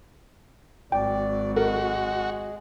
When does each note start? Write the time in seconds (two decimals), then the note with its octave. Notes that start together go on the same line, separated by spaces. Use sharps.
0.92 G#1 F#3 D5 G5
1.56 G#3 F#4 A4 A#4